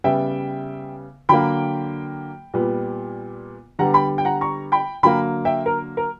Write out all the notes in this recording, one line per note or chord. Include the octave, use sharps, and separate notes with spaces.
C#3 G3 B3 E5 G5
D3 F#3 A#3 G5 B5
A#2 G3 B3
D3 G3 B3 F#5 A#5
G5 B5
G5
F#5 A#5
A#5 C#6
G5 B5
D3 F#3 A#3 G5 B5
E5 G5
A#4
A#4